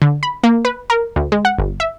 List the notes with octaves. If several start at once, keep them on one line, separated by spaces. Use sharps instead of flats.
D3
B5
A#3
B4
A#4
D2
G#3
F#5
G1
E5